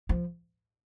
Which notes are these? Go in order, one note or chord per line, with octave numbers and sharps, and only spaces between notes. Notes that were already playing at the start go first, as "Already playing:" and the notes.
F3